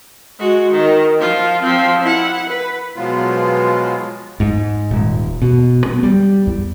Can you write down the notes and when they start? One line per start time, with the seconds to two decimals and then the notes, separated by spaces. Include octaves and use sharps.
0.40 G#3 F#4
0.71 D#3
1.20 F3 F4
1.62 F3 C4
2.03 E4 F#5
2.49 B4
2.96 B2 F3 F#3 G#3 B3 F4
4.40 G#2
4.91 D#1
5.42 B2
5.86 B3
6.03 G3
6.47 E2